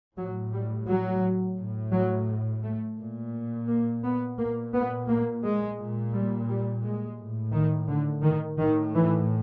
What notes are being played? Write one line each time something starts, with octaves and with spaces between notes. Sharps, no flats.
A2 F#3
G3
F#3
A2
F#3
A3
A#2
A#3
B3
A#2 A#3
B3
A#3
G#3
A#2
G3
G3
G#3
A2
D#3
D3
D#3
A2 D#3
E3